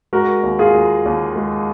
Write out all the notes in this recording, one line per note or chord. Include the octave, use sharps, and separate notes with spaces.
G#3 F#4 A#4
D#2
F4 G#4
D#2
D#2
G#3